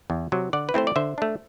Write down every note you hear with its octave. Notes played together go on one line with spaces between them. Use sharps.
E2
C3 F#3
D3 D5 F#5
B4
A3 C4 E4 C5
D5
D3 C5 E5
A3 D4